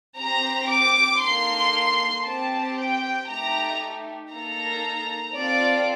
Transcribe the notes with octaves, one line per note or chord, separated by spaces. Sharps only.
C4 G4 A#5
D6
A#3 D#4 A4 C6
C4 G4 A5
G5
A3 D#4 G4 A#5
A#3 D#4 A4 A#5
C4 F4 A4 D5